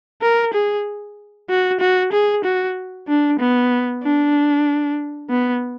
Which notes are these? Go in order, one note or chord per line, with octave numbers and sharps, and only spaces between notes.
A#4
G#4
F#4
F#4
G#4
F#4
D4
B3
D4
B3